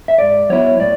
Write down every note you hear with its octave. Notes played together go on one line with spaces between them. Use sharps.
E5
G#2 D5
F#3 B3 E4 C#5
A2 D5